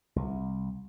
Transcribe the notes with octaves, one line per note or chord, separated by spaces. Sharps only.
C2